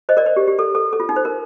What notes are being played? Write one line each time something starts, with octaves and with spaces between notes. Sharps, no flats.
C5 D#5
A#4 D5
C5
G4
G4
A4
A4
A4
F4
D#4
C5
A#4